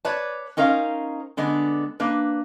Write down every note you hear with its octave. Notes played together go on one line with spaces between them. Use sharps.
B4 C#5 D5 A5
C#4 D#4 A#4 C5 F5
D3 G#3 B3 D4
A#3 D4 B4